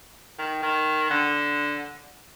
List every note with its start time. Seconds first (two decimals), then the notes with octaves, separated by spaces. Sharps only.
0.39 D#3
0.63 D#3
1.10 D3